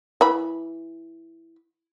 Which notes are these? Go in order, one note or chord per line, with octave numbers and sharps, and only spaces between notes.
E3 B5